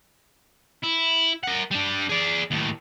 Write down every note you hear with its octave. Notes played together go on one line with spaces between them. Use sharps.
E4
A#4 F#5
G3 D4
G#4 D5
D#2 A2